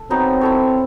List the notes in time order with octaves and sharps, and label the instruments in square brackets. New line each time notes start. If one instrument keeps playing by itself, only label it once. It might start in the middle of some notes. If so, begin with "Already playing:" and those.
Already playing: [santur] A4
[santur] F#3 B3 D#4 [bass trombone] C4
[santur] E4 A4 C#5